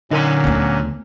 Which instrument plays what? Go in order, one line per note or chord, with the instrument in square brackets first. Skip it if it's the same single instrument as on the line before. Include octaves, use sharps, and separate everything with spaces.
[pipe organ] A#2 F#3 C#4 [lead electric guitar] D3 C6 [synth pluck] D#4 A#4 D#7
[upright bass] D2 B3